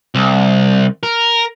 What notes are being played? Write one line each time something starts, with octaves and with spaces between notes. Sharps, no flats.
C2
A#4